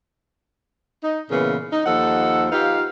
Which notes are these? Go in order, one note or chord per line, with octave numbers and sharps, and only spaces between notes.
D#4
A#2 C#3 E3 A#3 B3
D#4
D#2 F3 A4 D#5 F#5
D#4 F4 G4 B4 F5